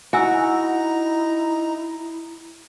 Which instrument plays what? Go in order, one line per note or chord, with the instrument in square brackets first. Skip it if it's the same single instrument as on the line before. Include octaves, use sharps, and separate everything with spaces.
[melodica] D#4 A#5 [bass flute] E4 [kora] F#4 [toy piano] F#5 G#5 E6